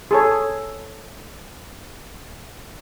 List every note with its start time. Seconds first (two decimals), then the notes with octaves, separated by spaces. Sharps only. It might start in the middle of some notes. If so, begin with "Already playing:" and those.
0.11 G#4 A4 C#5